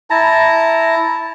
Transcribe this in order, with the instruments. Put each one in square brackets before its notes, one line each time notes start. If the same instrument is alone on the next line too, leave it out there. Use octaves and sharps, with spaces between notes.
[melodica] E4 A5 A#5